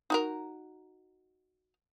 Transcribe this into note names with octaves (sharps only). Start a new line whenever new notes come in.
D#4 F#4 A#4